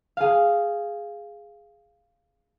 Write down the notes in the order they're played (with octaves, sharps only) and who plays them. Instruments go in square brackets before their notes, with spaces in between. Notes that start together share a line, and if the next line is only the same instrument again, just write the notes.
[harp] G#4 F5